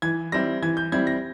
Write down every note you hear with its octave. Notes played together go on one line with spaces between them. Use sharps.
E3 G#6
G3 C4 E4 A#6
E3 G#6
G6
G3 C4 E4 G#6
A#6